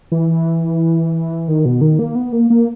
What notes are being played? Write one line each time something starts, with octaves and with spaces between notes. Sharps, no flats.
E3
D#3
B2
D#3
A#3
B3
A#3
A#3